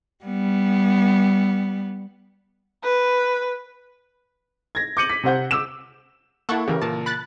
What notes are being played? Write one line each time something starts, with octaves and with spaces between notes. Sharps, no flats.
G3 B3
B4
G#6 A#6
D6 G6 C#7 D#7 F#7
B6
C3 C5 F#5 G6
D6 E6 E7
A#3 E4 A4 F#5 C#6
C#3 E3 G4 A#4
A#2 A#4 A5
B5 F#6 A6